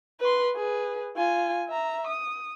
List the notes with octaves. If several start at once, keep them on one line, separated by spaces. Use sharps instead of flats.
B4 C6
G#4 B4
F4 G#5
E5 A#5
D#6